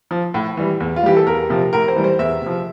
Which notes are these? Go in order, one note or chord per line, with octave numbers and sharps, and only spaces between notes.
F3
A2
E3 G3
E2
F4
E3 G3 G4
A4
E2 A#4
C3 F3
A2 A#4
C5
E3 G3
C5
E2 E5
C3 F3